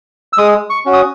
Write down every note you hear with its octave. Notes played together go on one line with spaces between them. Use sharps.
E6
G#3 D#6
C#6
C#4 F#4
D#6